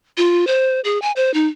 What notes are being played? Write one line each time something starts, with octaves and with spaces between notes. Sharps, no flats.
F4
C5
G#4
G#5
C5
D#4